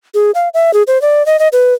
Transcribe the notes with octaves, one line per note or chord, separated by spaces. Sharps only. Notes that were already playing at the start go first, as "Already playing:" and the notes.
G#4
F5
E5
G#4
C5
D5
D#5
D#5
B4